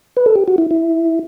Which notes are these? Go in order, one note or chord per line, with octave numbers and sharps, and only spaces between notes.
B4
A4
G4
F#4
E4
E4